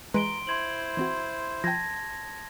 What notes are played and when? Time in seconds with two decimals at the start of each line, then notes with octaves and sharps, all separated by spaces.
0.14 E3 G#3 B4 A#5 C6 D7 G7
0.47 E4 C5 C6 G#6 F#7
0.97 E3 C4 F#4
1.64 F3 G5 A5 G#6 A#6